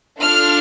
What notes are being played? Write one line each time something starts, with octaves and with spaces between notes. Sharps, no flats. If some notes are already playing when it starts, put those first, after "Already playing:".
D4 F4 A4 F6